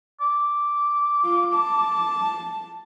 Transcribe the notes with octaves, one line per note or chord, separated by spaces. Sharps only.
D6
F4
A5